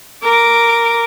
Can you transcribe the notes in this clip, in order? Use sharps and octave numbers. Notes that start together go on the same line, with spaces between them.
A#4 D6